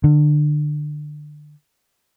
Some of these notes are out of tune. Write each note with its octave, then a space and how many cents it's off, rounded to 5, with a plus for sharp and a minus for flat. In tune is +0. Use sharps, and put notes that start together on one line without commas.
D3 +25